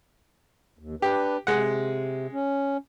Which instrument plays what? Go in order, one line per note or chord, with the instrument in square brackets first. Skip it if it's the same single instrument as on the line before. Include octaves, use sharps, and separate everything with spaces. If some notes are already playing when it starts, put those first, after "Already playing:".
[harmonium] D#2
[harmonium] D4 B4 [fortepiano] G4
[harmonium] C3 [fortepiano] G#3 F#5
[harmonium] C#4